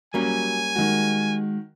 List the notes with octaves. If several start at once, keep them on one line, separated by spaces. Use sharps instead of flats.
F#3 G3 A#3 C#4 G#5
D#3 G#3 F#4